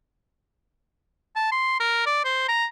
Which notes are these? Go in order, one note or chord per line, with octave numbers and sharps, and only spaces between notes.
A5
C6
A#4
D5
C5
A#5